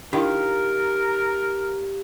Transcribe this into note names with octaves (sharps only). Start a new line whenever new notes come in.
D#3 D4 E4 F4 G4 A#4 F5